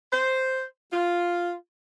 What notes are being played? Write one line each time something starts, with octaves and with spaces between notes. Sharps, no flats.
C5
F4